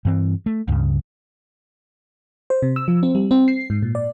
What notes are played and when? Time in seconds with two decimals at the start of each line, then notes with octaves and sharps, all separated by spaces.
0.05 G2 E3 C4
0.46 A3
0.68 C#2 G2 C#3
2.50 C5
2.62 C3
2.76 E6
2.88 F3
3.03 C4
3.15 G3
3.31 C4
3.48 C7
3.70 G#2
3.83 A#2
3.95 D5